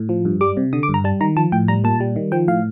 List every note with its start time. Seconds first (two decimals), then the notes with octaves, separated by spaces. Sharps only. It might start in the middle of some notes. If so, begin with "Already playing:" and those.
Already playing: A2
0.09 F3
0.25 G2
0.41 G3 D6
0.57 C3
0.73 D3 D#6
0.83 D6
0.89 G2
0.94 A#5
1.04 G3 A5
1.21 D#3 A#5
1.36 F3 A5
1.52 A2 G5
1.68 G3 A#5
1.84 A#2 A5
2.00 G3
2.16 D#3
2.32 F3 G5
2.48 A2 F5